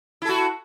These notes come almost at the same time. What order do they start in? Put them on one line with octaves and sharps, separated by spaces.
E4 A4 F#4